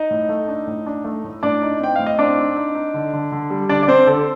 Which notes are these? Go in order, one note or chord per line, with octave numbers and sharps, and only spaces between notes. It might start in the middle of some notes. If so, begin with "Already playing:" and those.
Already playing: D#4 D#5
A2
A3
D4
A2
D4
A3
A2
A2 D4 D5
D#4
C4 G5
A2 F5
D#5
C4 D4 D5
D#4
D#4
D#4
D3
D3
D3
G3
D3 D4 D5
D5
C4 D4 C5
D3 A4